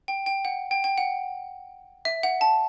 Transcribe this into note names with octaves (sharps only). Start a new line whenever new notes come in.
G5
G5
F#5
G5
G5
F#5
E5
F#5
A5